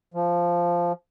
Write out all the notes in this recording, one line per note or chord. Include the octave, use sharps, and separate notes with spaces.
F3